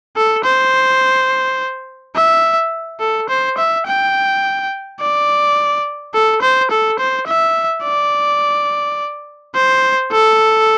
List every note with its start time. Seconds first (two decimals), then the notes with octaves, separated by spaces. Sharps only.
0.17 A4
0.44 C5
2.16 E5
3.00 A4
3.29 C5
3.58 E5
3.86 G5
5.00 D5
6.14 A4
6.42 C5
6.71 A4
6.99 C5
7.27 E5
7.84 D5
9.55 C5
10.12 A4